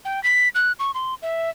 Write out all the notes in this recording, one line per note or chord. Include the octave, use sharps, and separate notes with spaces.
G5
B6
F#6
C#6
C6
E5